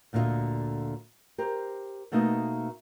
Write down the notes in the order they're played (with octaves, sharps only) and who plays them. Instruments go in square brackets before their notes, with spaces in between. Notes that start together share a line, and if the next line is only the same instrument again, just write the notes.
[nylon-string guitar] D2 A#2 D3 G#3 F4 D#5
G4 A#4 C5
B2 A3 A#3 D#4 D#5